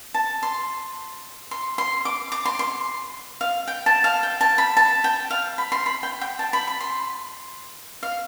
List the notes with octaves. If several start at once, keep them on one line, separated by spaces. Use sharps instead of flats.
A5
C6
C6
C6
D6
D6
C6
C6
F5
G5
A5
F5
G5
A5
B5
A5
G5
F5
B5
C6
B5
G5
G5
A5
B5
B5
C6
F5